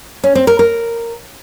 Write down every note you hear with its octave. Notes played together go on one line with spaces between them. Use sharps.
C#4
C4
A#4
A#4